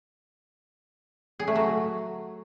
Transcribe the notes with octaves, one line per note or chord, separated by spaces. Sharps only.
G#4
A3
F#3